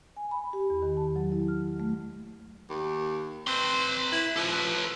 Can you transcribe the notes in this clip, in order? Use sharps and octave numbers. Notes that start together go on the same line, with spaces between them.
G#5
B5
G4
E2
D#3
A5
F#3
E4
F6
A3
D#2
C4 B4 C6
E4
F3 A4 B4